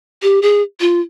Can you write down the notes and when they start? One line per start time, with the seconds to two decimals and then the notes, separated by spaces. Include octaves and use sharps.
0.22 G4
0.42 G#4
0.80 F4